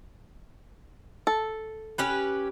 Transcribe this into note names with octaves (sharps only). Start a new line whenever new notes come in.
A4
C#4 G4 B4